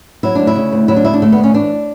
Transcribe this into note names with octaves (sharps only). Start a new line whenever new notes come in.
F#3 E4
D2 D4
E4
C#3
D2
F#3 E4
D4
D2 E4
D4
D3 A3
B3
D2
C#4
E3 D4